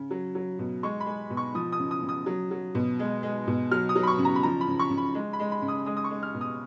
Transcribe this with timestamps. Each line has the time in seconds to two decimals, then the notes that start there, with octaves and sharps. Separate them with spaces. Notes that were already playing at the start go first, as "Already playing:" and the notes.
Already playing: C#3
0.11 F#3
0.35 F#3
0.59 B2
0.83 G#3 C#6
1.00 B5
1.06 G#3
1.30 B2
1.37 C#6
1.55 F3 D#6
1.72 D#6
1.79 C#3
1.91 D#6
2.02 C#3
2.09 D#6
2.26 F#3
2.51 F#3
2.75 B2
2.99 G#3
3.23 G#3
3.47 B2
3.71 F#3 F6
3.89 D#6
3.95 F#3
4.03 B5
4.07 C#6
4.18 C#3
4.25 A#5
4.36 B5
4.43 F3 A#5
4.61 B5
4.67 C#3
4.79 C#6
4.90 C#3
4.97 B5
5.14 G#3
5.33 B5
5.39 G#3
5.52 B5
5.62 C#3
5.68 D#6
5.86 G#3 D#6
5.97 D#6
6.04 C#6
6.10 G#3
6.23 F6
6.34 B2
6.41 D#6